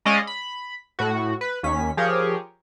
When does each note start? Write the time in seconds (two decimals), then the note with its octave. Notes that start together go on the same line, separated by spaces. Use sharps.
0.05 G#3 C#4 D5 D#5 F5
0.27 B5
0.99 A2 F#4
1.41 B4
1.63 D#2 C#4 B6
1.97 F3 G4 G#4 A#4 C#5